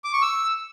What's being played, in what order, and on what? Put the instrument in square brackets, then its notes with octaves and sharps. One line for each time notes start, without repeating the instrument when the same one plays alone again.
[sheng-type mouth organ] D6
C#6
E6